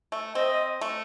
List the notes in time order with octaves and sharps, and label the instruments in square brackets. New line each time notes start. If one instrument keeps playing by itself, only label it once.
[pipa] A3
[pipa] C4 [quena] D#5
[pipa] A3